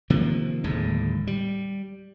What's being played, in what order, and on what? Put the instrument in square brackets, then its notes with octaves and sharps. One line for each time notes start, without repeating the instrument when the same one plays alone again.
[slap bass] C3 D#3 F3 A#3
D1 D#2 A2 G#3
G3